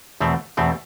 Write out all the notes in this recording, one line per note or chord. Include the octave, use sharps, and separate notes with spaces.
E2 B2 A3 C4
E2 B2 A3 C4